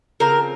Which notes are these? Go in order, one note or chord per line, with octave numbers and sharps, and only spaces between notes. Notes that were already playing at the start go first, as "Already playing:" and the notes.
C#3 F3 C4 A#4 A#5